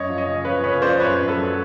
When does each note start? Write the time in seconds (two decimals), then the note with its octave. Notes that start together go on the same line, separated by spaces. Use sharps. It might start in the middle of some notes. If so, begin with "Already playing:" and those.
Already playing: F#2 C#5 D#5
0.08 F3
0.17 C#5 D#5
0.27 C#3
0.45 F3 B4 C#5
0.64 C#3 B4 C#5
0.82 F3 C5 D5
1.00 F#2 B4 C#5
1.19 F#2
1.28 A4 B4
1.37 F#3